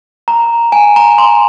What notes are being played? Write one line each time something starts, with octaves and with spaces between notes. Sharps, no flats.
A#5
G#5
A#5
C6